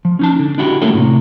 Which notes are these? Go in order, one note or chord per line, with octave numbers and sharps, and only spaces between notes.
F3
C#4 D#4 A5
D3
D4 E4 F#4 G4
A3 A#3 C#4 E4 F#4 A4
A2 C3